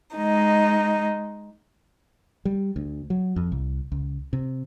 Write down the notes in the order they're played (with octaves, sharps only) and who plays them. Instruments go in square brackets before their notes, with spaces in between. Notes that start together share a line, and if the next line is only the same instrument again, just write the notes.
[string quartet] G#3 D#4
[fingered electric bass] G3
D2
F#3
F2
C2
C#2
C3